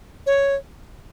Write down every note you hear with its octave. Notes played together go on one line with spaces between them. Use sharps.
C#5